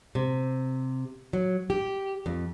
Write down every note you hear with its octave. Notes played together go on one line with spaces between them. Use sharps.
C3
F#3
G4
F2